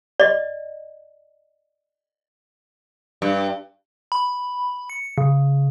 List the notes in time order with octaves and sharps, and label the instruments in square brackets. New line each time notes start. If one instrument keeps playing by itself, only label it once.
[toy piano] D5 D#5
[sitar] G2
[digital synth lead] B5
C#7
C#3